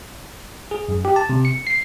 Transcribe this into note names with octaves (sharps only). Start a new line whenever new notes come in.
G#4
F#2
G4
A5
C3
C#7
C7